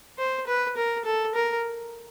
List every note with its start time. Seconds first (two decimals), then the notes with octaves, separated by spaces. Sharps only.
0.18 C5
0.47 B4
0.77 A#4
1.05 A4
1.35 A#4